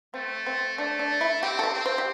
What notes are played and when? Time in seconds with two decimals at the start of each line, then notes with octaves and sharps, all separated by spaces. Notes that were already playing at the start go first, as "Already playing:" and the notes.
0.14 A3 C4
0.46 C4
0.78 A3 D4
0.99 D4
1.21 E4
1.43 C4 G4
1.59 A4
1.64 G4
1.74 C4
1.86 C5
1.98 G4